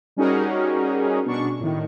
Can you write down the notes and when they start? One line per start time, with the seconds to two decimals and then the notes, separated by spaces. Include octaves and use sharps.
0.16 G3 C#4 D#4 F#4 G#4 A#4
1.25 B2 D4 C#6
1.60 A2 D#3